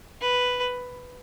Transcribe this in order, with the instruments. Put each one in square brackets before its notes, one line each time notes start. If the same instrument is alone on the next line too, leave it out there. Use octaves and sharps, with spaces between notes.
[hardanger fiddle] B4